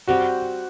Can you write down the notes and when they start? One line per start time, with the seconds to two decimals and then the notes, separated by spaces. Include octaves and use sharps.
0.08 G3 C4 F#4 G4